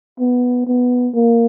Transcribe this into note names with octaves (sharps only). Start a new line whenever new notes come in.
B3
B3
A#3